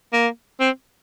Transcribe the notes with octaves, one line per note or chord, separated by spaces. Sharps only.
A#3
C4